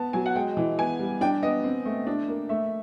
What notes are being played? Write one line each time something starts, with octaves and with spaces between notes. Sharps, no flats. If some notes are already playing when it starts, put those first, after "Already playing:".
Already playing: B3 A5
F#3 G#5
F#5
G#3 G5
E3
B3 G#5
G3
D4 G5
B3 D#5
C4
A3
D4
A#3
A3 E5